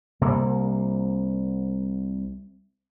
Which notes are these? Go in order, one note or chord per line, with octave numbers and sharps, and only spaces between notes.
C2 C3 A#3